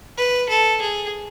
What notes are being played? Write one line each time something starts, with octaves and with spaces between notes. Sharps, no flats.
B4
A4
G#4